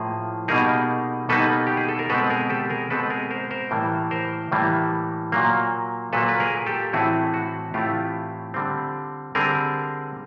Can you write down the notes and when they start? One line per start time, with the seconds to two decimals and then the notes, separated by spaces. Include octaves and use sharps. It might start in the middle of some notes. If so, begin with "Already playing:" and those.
Already playing: A2 F3 A#3 G#4
0.48 B2 G3 A#3 D#4 G#4 A#4
1.29 B2 G3 A#3 D#4 A4 B4
1.67 G4
1.77 G#4
1.89 A4
1.99 A#4
2.10 B2 G#3 C4 A4 B4
2.30 G#4 A#4
2.50 G4 A4
2.70 G#4 A#4
2.90 B2 G#3 C4 A4 B4
3.10 G#4 A#4
3.31 A#4 C5
3.51 A#4 C5
3.71 A2 E3 G3 A#3
4.11 A#4 C5
4.52 A2 E3 G3 A#3
5.32 A#2 F#3 A#3
6.13 A#2 F#3 A#3 A4 B4
6.29 B4
6.40 G#4 A#4
6.66 G4 A4
6.93 A2 E3 A3 C4 E4 F#4 G#4
7.34 F#4
7.74 A2 E3 A3 C4 E4 F4 G4
8.54 D3 G3 C4
9.35 D3 G3 C4 G#4 A#4